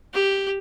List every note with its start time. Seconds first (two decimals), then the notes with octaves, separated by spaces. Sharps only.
0.13 G4